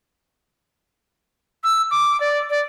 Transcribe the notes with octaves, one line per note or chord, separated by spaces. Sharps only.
E6
D6
D5
D5